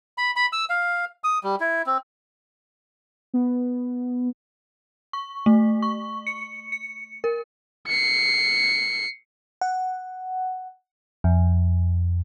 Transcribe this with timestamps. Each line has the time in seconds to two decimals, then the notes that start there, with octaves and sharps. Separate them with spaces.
0.18 B5
0.36 B5
0.53 E6
0.70 F5
1.24 D#6
1.43 G3
1.60 E4
1.86 C4
3.34 B3
5.13 C#6
5.46 A3
5.82 C#6
6.27 C#7
6.72 C#7
7.24 A#4
7.88 C7 C#7
9.61 F#5
11.24 F2